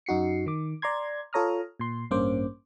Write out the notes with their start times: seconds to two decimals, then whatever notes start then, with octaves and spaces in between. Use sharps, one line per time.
0.06 F#2 D#4 F#4 C7 C#7
0.46 D#3 D6
0.82 D5 A#5 C6 G#6
1.33 F4 A4 C#5 A#5 D#6 F6
1.79 A#2 C6
2.11 A1 G2 A#3 C#4 C5 D6